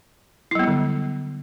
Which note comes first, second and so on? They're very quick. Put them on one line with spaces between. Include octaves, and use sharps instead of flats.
E4 F#3 B3 G3 D3